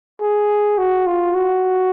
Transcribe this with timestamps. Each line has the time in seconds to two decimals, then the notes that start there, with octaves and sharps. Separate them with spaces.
0.21 G#4
0.78 F#4
1.07 F4
1.35 F#4